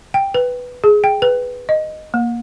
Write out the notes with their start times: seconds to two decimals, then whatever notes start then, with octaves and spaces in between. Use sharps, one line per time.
0.14 G5
0.34 B4
0.84 G#4
1.04 G5
1.22 B4
1.69 D#5
2.14 A#3